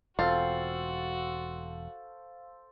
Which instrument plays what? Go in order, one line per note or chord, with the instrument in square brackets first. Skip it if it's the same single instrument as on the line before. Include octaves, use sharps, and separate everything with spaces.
[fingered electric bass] E1 [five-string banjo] C4 F4 [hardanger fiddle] F#4 [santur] A4 C5 F5